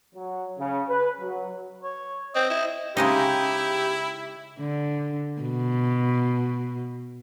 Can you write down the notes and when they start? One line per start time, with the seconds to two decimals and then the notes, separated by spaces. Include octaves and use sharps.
0.15 F#3
0.59 C#3
0.89 B4
1.20 F#3
1.83 C#5
2.35 C4 D#5
2.50 E4
2.97 C#3 G#3 D#4 E4 G4
4.59 D3
5.42 B2